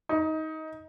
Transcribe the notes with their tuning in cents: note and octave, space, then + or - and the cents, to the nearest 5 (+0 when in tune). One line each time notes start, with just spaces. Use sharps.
D#4 +20